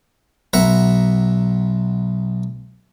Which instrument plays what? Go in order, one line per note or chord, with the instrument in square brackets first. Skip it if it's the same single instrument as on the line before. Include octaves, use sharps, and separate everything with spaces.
[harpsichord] B1 E5 F#5 A#5